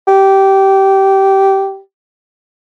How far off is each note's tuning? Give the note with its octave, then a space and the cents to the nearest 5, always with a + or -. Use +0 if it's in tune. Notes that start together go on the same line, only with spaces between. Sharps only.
G4 -15